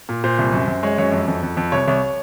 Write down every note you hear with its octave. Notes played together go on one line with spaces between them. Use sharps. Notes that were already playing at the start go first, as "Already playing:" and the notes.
A#2
A#2 C5
C2
F#2
F#2
G#3 C#5
F#2 C#5
F2
F2
F2
F2
C2 C#5
C2 C#5